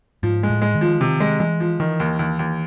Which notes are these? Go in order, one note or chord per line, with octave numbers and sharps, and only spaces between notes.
G#2 F3
G#3
A2
G#3
D#3
F3
C3 D#3
G#3
E3 G#3
F3
D#3 E3
D#2
D#2
D#2